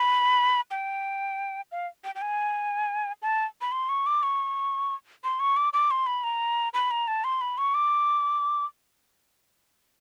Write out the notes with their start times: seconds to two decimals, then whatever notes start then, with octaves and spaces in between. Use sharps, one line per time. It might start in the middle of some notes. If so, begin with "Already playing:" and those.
Already playing: B5
0.71 G5
1.72 F5
2.04 G5
2.15 G5
2.22 G#5
3.22 A5
3.61 B5
3.72 C6
3.89 C#6
4.07 D6
4.23 C#6
5.24 C6
5.40 C#6
5.57 D6
5.73 D6
5.91 C6
6.06 B5
6.24 A#5
6.74 B5
6.91 A#5
7.08 A5
7.24 C6
7.41 B5
7.58 C#6
7.74 D6